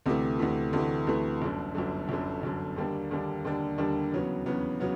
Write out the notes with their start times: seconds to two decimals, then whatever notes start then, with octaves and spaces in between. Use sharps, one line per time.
0.06 D2 C3 E3 A3
0.39 D2 C3 E3 A3
0.73 D2 C3 E3 A3
1.07 D2 C3 E3 A3
1.42 G1 F#2 D3
1.75 G1 F#2 D3
2.09 G1 F#2 D3
2.43 G1 F#2 D3
2.76 D#2 D3 G3 A#3 D4
3.11 D#2 D3 G3 A#3 D4
3.45 D#2 D3 G3 A#3 D4
3.78 D#2 D3 G3 A#3 D4
4.12 E2 C#3 F#3 B3
4.46 E2 C#3 F#3 B3
4.80 C#3 F#3 B3